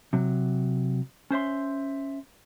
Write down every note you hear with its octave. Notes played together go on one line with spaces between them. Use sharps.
C3 F#3
C#4 C5 E5 C6